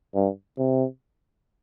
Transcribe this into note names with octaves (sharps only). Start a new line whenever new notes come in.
G2
C3